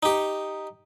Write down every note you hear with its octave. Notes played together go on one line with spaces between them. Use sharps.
D#4 G4